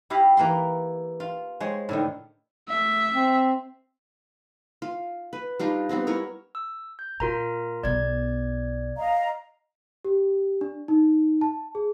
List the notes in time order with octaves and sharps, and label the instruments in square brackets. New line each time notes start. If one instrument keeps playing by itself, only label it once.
[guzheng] E4 G4 D#5 F5 B5
E3 A#3 B5 C6
F4
G#3 C5 C#5
A2 D3 D#3
[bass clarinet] A3 [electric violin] E5
[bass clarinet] C4
[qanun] F4
B4
G3 D4 D#4 F4
G3 B3 C4 D#4
E4 A#4 C#5
[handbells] E6
G6
[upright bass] A#2 [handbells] F4 A#4 A#5
[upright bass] B1 B3 [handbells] D5 G#6
[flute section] D#5 F5 A#5
[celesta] G4
D4
D#4
A5
G#4